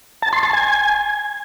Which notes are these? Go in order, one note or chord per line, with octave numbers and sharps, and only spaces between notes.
A5
C6
A5
G#5